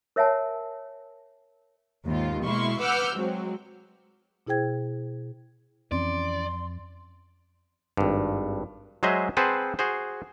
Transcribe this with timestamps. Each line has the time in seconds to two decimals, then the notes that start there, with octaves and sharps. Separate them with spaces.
0.16 A#4 C#5 E5 F#5 G#5 A5
2.06 D#2 G#2 F4
2.42 B2 G#3 A#3 E4 C6 C#6
2.80 B4 F#5 D6 E6 F6 G6
3.16 F#3 G#3 C4
4.47 B2 E4 G#4 C5 G5 G#6
5.92 F2 E3 C4 C#4 D5 C6
7.97 G#1 G2
9.03 F#3 G#3 G#4 C5 D#5 E5
9.37 C4 G#4 B4 C5 F#5 A5
9.79 F#4 G#4 C5